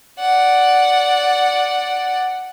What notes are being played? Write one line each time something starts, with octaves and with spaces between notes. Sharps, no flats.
D5 F#5